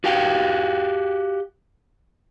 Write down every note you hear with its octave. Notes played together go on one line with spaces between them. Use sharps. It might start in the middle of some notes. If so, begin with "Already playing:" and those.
F#4 G4 F5 G5